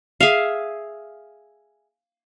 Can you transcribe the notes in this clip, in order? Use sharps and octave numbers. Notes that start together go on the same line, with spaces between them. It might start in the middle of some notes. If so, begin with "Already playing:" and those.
G#4 E5 F5